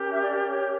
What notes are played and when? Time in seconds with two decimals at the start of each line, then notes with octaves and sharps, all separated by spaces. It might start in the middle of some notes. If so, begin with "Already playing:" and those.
Already playing: C#4 G4 A#4
0.11 E5
0.21 D5
0.43 D5
0.50 C#5